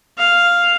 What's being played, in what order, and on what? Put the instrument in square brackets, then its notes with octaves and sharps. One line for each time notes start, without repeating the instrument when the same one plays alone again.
[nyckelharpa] F5